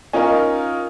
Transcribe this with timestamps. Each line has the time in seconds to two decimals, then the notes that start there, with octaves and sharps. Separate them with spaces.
0.13 C#4 D#4 F4 A#4